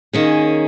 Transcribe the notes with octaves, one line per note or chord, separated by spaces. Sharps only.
D#3 A#3 C#4 G#4